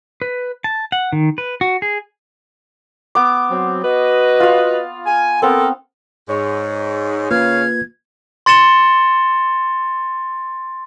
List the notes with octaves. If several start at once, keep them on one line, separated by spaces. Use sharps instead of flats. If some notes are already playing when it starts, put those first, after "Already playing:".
B4
A5
F#5
D#3
B4
F#4
G#4
B3 D6
F#3 C4
F#4 B4 D#5
F4 F5
G#5
B3 C4 A4 A#4
G#2 C#5
C#3 A#3 F4 B4 F5 G#6
C6 A6 C#7 E7 G7